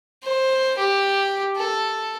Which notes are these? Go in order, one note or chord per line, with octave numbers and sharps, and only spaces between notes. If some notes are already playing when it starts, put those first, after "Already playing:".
C5
G4
A4